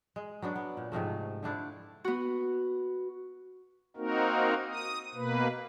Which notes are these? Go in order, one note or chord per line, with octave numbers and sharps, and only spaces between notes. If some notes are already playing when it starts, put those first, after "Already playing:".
G#3
F#3 B3 D4
B3
A#2
G#2 C3 F3 A3
D3 A3 D4 E4
B3 F#4
A#3 C4 D#4 F#4 A#4
D#6
B2 A#3 B4